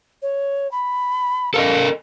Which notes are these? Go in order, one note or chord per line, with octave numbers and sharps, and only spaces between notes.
C#5
B5
A4 A#4 D#5 F5